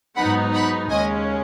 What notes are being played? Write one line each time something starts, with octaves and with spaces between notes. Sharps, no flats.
G#2 F#3 B3 D#4 F#5 B5
F#5 B5
D#2 C#3 G#3 C#4 D#5 G#5